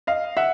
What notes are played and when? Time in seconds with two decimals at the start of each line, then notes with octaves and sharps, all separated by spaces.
0.07 D#5 F5
0.37 E5 F#5